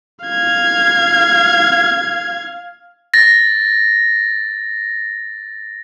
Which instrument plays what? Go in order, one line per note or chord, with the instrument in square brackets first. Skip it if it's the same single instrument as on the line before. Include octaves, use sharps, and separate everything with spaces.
[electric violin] F5 G#6
[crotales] A6 A#6